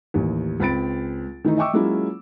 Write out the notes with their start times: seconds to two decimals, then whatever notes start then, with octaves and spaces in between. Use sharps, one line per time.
0.14 A1 D#2
0.60 C#2 C4 B5 A6 D7
1.44 D#3 E3 A3 D#4
1.57 D#5 E5 G5 C#6 D6 E6
1.73 F#3 G#3 A#3 C#4 E4 F4